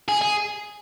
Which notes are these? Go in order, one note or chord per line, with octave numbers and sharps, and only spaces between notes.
G#4
G#4